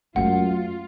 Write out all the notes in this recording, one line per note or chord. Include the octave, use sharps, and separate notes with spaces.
F#2 G#3 A3 F4 F#5